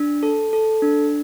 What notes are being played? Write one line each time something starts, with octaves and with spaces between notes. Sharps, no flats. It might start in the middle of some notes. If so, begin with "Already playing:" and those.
Already playing: D4
A4
A4
D4